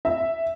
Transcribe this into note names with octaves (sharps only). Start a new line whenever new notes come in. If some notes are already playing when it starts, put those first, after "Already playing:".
E5